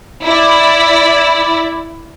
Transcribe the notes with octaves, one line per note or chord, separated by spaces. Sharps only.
E4 D5